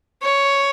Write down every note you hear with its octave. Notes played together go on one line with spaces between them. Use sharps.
C#5